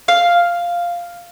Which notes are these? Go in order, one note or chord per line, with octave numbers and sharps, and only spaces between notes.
F5